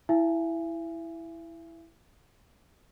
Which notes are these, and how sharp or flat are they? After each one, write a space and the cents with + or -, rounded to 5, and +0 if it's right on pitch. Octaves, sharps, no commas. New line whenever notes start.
E4 +0 E5 +40 G#5 +0